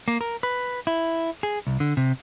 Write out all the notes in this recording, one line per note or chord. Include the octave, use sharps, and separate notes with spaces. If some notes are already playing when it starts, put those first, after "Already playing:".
A#3
A#4
B4
E4
G#4
C2
D3
C3